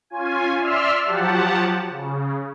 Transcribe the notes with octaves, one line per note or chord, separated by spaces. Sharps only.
C#4 F4 G#5
D5 E5 C6 E6 F6
F3 F#3 G4 F#5 A5
C#3